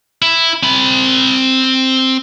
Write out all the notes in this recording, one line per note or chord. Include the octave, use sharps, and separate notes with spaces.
E4
C4 B5